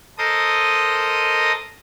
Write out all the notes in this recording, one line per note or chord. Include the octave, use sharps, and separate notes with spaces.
A4 A#4 C5 D#5 D#6